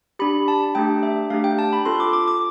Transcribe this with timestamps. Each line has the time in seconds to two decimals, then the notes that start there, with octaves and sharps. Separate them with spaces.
0.19 D4 G4 B5
0.48 A5
0.75 A3 D4 G4 G5
1.03 E5
1.30 A3 D4 G4 F5
1.44 G5
1.59 A5
1.73 B5
1.85 C4 F4 A4 C6
2.00 D6
2.13 D6
2.28 D6